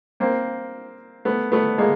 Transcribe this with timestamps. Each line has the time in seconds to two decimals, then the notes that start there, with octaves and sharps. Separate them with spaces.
0.20 A#3 C4
1.25 A3 B3
1.52 A3 B3
1.78 G#3 A#3